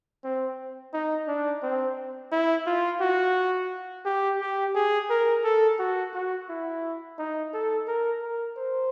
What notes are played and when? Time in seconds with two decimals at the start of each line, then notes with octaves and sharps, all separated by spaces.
0.24 C4
0.93 D#4
1.27 D4
1.63 C4
2.31 E4
2.66 F4
3.00 F#4
4.05 G4
4.41 G4
4.75 G#4
5.10 A#4
5.44 A4
5.79 F#4
6.14 F#4
6.49 E4
7.18 D#4
7.53 A4
7.87 A#4
8.22 A#4
8.56 C5